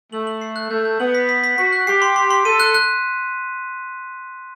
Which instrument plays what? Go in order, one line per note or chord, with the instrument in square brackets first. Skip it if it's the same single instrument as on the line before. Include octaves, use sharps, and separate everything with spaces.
[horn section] A3 [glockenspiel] F#7
[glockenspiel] F#7
C7
F#6
[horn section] A3 [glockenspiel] G6
[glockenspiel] G6
[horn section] B3 [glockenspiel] F#7
[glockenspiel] B6
B6
B6
[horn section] F#4 [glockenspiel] B6
[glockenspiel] F#6
[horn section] G4 [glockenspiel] C7
[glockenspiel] C6
C6
C6
[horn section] A4 [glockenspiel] D#7
[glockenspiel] F#6
F#6